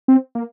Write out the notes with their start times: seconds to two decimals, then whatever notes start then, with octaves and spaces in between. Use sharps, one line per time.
0.08 C4
0.35 A#3